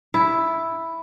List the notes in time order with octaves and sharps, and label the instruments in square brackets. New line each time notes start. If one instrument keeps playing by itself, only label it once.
[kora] E4